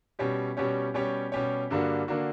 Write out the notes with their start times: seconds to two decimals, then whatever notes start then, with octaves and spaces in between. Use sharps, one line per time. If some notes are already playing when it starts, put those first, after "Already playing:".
0.19 B2 G3 C#4 G4 C#5
0.57 B2 G3 C#4 G4 C#5
0.94 B2 G3 C#4 G4 C#5
1.32 B2 G3 C#4 G4 C#5
1.70 G2 D3 A#3 D4 F#4
2.08 D3 A#3 D4 F#4